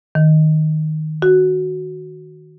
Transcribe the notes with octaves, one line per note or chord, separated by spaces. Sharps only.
D#3
F#4